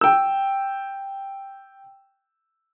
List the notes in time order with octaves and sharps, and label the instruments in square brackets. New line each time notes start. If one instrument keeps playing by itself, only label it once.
[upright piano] G5 E6